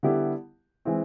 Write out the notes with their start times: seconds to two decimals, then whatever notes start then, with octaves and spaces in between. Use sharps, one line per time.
0.03 D3 G3 B3 E4 G4
0.85 E3 G#3 C4 E4